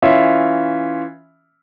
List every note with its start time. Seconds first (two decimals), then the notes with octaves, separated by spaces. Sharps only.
0.02 E3 C#4 F4 E5